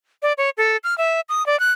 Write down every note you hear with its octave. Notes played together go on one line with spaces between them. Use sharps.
D5
C#5
A4
F6
E5
D#6
D5
F#6